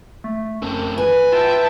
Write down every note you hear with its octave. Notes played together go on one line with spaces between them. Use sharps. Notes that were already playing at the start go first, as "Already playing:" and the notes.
A3
F#2 A3 C4
B4 G#5
F4 E5 G5 A5